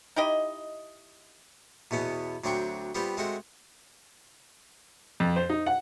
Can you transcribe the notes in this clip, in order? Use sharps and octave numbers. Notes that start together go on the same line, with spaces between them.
D#4 E4 G4 D#5
E2 B2 B3 C#4
D2 F#3 C4 D4 G5 C#6
G3 B3 C4 F4
G#3 A3 C4 F#4
F2
C5
D#4
F#5